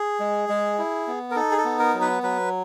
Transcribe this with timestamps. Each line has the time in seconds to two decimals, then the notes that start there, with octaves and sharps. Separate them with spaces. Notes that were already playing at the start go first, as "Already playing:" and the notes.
Already playing: G#4
0.20 G#3
0.49 G#3
0.79 E4
1.07 B3
1.31 A#4
1.36 D#4 A4
1.51 G#4
1.58 A4
1.65 B3
1.79 A#4
1.94 F#3
2.01 B4
2.23 F#3 B4